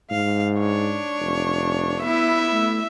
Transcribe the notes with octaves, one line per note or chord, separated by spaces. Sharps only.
G#2 F5
D4 C#5
F1
B3 E4 E5
A3